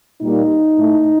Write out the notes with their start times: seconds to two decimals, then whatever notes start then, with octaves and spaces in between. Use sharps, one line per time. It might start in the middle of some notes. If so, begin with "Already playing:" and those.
0.22 A#2 G3 A#3 D#4
0.77 A2 A3